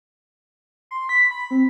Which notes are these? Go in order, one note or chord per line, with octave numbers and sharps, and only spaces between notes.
C6
B6
B5
C4